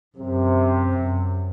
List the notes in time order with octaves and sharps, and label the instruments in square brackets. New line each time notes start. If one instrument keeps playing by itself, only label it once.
[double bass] F#2 [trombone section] C3
[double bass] F#2